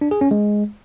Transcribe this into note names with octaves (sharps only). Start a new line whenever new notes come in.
D4
G#4
C#4
G#3